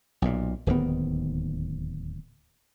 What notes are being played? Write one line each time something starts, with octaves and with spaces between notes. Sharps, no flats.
B1 A#2
D1 D#2 D#3 B3